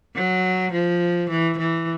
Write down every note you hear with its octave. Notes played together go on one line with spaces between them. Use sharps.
F#3
F3
E3
E3